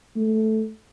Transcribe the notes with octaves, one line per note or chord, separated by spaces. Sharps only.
A3